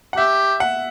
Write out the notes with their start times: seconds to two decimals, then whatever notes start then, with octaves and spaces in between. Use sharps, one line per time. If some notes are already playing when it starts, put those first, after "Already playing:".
0.13 F#5
0.17 G4 E5
0.60 F#5